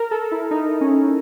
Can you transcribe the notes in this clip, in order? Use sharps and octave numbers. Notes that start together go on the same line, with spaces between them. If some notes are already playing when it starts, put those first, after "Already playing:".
Already playing: A#4
A4
E4
D#4
C#4